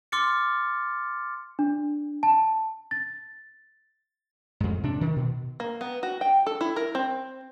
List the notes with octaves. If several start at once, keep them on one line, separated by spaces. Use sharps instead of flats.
C6 D6 F6 A6 C#7
D4
A5
A6
F2 G#2
C3 D4
D#3
B2
A#3
B3
F#4
G5
A4
E4
A#4
C4